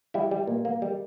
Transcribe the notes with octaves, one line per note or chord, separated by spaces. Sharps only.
G3 E4
G3
A#2
A#3
G3